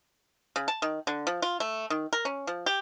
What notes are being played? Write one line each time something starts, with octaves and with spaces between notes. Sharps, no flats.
C#3
A5
D#3
D3
F3
F4
A3
D#3
A#4
C#4
F3
G4